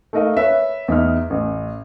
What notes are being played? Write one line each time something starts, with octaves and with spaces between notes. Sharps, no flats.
A3 D#4 A#4 D#5 F5
B4 C#5 E5
E2 D#4 E5 F6
A1